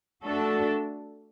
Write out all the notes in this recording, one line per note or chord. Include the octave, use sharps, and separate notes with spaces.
A3 D4 F#4 A4